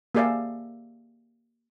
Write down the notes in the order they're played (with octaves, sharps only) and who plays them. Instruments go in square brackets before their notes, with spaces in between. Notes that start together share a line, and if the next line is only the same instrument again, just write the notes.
[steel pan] A#3 G4 G#4 D5 E5 F5